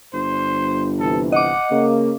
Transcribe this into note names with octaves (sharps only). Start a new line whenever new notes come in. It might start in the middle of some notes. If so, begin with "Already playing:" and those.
G1 C5
C3 E3 A4
D#5 F#5 D6
C#3 A#3